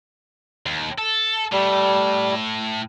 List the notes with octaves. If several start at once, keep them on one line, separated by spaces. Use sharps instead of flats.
D#2
A4
A2 G3